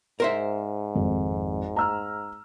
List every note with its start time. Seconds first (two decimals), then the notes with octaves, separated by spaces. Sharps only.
0.20 G#2 A#4 C5 E5
0.95 G#1 F2
1.76 A#5 E6 F6